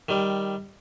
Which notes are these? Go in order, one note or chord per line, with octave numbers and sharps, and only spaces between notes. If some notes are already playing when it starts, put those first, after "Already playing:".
D#3 G3